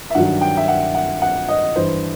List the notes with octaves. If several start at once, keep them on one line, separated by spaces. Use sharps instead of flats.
E5
G2 D#3 F#3 F#5
G5
E5
F#5
F#5
F#5
D#5
G2 E3 C5